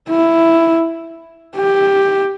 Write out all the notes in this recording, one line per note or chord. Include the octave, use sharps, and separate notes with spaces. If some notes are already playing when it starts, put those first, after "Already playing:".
E4
G4